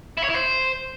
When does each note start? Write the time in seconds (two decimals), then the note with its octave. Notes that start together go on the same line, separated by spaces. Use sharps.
0.17 E4
0.24 C#5
0.30 E4
0.36 C5